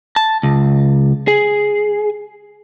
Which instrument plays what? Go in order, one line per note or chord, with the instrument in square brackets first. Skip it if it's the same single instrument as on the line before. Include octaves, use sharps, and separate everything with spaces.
[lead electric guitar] A5
C#2
G#4